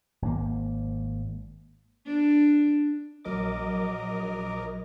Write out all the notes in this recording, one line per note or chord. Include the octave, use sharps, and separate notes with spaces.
G#1 A#3
D4
A#1 F#3 A#4 D#5 D6